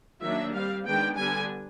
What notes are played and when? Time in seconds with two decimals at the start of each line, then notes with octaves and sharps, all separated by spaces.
0.22 D#3 F#3 A#3 D4 E5
0.53 G3 C4 F5
0.85 D#3 G#3 B3 D4 G5
1.16 D3 G3 B3 D4 G#5